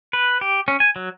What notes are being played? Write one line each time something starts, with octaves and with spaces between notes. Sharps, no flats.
B4
G4
C#4
G#5
F#3